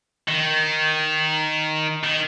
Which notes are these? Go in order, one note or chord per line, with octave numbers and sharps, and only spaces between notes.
D#3
D#3